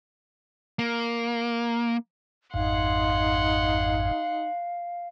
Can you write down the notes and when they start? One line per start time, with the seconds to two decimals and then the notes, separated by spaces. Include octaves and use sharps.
0.79 A#3
2.54 G#1 F2 G#2 D#4 F5 F#5 C6